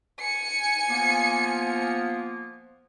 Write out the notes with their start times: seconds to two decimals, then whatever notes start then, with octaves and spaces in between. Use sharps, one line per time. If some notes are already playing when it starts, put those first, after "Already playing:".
0.20 G#5 C#7
0.89 F3 A#3 B3